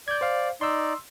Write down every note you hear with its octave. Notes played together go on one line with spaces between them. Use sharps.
D5 G6 G#6
C5 F5
D#4 D5 C6 E6